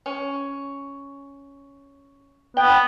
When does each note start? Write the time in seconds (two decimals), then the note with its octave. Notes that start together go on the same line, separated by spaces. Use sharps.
0.06 C#4
2.57 B3 G5